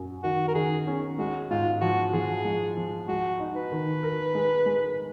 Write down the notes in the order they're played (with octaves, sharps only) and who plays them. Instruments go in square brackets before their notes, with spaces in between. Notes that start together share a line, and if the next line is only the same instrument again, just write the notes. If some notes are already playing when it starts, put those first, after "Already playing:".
Already playing: [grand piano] F#2 F#3
[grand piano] D#3 [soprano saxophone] F#4
[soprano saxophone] A#4
[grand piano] D#3 [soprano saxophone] G#4
[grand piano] C#4
[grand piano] G#3 [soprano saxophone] F#4
[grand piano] G#2 [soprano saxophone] F4
[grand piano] F3 [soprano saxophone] F#4
[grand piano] F3 [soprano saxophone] G#4
[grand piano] G#3
F3
[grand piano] G#3 [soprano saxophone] F#4
[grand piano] D#4
[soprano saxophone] B4
[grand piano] D#3
A#4
G#3
G#3